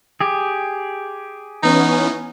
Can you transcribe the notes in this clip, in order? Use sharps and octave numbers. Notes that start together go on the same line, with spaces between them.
G4 G#4
E3 B3 C#4 D#4